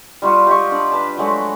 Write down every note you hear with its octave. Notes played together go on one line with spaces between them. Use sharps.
G3 F4 F#4
G4 D#5 C#6
D4 D5
B4 A5
F#3 G#3 A3 F#4